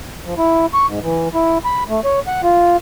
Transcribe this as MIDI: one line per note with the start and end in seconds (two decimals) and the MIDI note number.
0.26 0.34 53
0.38 0.66 64
0.73 0.86 85
0.88 1.00 44
1.03 1.29 52
1.34 1.58 64
1.65 1.84 83
1.89 2.00 57
2.04 2.20 73
2.27 2.41 78
2.43 2.77 65